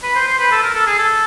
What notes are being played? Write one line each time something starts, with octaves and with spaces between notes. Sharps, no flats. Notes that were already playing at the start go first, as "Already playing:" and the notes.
B4
C5
C5
B4
A4
A#4
A4
G#4
A4